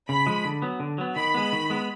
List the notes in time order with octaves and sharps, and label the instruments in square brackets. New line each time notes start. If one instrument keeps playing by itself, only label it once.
[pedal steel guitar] C#3 [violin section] B5
[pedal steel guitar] F3 G#3
D3
F#3 B3
D3
F#3 B3
[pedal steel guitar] D#3 [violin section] B5
[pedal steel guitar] G#3 B3
D#3
G#3 B3